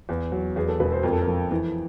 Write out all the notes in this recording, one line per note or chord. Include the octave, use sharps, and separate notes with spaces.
E2
F#3
E2 G#4
A4
E1 B4
C5
F2 A#4
A4
A#4
F3
E3